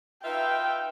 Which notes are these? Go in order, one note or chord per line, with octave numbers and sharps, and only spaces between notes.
D#4 F4 B4 E5 G5